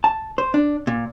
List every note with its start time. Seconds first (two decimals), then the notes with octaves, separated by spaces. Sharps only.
0.04 A5
0.38 C5
0.54 D4
0.87 A#2